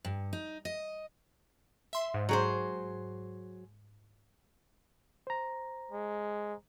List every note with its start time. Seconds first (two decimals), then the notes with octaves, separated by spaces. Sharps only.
0.05 G2
0.33 D#4
0.65 D#5
1.93 E5 C6
2.14 G#2
2.29 F#3 G#4 C5
5.27 C5 A#5
5.91 G#3